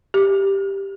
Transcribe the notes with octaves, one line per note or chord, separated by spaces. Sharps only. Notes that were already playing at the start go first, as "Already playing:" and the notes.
G4